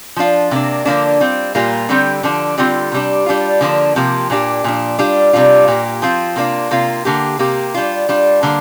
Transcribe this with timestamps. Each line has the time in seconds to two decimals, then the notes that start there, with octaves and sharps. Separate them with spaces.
0.16 F3 D4 F4
0.51 C3 A#3 D4
0.85 D3 F3 A#3 D4
1.20 G3 C4 F4
1.55 A#2 G3 A#3 F4
1.89 D3 G3 C4 G4
2.23 D3 F3 D4
2.58 D3 G3 C4 F4
2.92 C3 G3 D4
3.26 G3 D4 F4
3.61 D3 F3 A#3 D4
3.96 C3 F3 A#3 G4
4.30 A#2 A#3 D4 G4
4.64 A#2 F3 D4
4.99 G3 D4 F4
5.33 C3 G3 D4 F4
5.68 A#2 A#3 G4
6.02 F3 C4 F4
6.36 C3 A#3 D4 F4
6.71 C3 A#3 F4
7.05 D3 A#3 G4
7.39 C3 A#3 G4
7.74 G3 D4 F4
8.09 G3 D4 F4
8.43 D3 G3 A#3